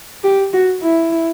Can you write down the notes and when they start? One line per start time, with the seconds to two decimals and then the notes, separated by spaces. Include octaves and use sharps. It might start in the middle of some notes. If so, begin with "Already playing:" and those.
0.24 G4
0.53 F#4
0.83 E4